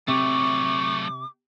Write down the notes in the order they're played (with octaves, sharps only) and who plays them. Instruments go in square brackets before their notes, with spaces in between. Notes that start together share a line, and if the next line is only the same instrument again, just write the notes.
[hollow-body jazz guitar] C3 [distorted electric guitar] F#3 A3 [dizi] C#6 [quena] D6